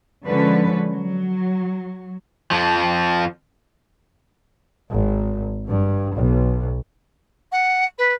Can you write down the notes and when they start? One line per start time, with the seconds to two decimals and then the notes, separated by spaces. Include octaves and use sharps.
0.25 D3 F3 G#3 C#4 B4
0.91 F#3
2.51 F2 F3
4.91 G#1
5.68 G2
6.15 B1
7.52 F#5
7.98 B4